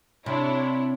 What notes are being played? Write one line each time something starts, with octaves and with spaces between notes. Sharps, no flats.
C3 D4 E4 C#5